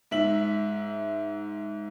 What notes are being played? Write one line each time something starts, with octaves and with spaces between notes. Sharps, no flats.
G#2 E5 F#7